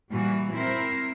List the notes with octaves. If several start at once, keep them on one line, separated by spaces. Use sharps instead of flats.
A#2 E3 G3 F#4
C4 E4 A#4 C5